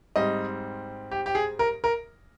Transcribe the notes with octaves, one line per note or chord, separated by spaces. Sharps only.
G#2 G3 C4 D#5
G4
G4
G#4
A#4
A#4